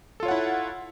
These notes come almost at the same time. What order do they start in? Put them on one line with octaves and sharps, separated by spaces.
A4 F4 C#5 F#5 E4